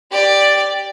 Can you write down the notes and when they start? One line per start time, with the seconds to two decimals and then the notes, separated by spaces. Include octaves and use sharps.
0.11 G4 D5